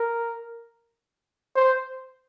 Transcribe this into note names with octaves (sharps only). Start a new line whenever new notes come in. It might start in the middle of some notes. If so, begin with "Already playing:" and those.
Already playing: A#4
C5